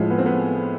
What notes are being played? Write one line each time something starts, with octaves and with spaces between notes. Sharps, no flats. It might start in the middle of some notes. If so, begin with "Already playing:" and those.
Already playing: A2 F3 G#3
B3
C4
B3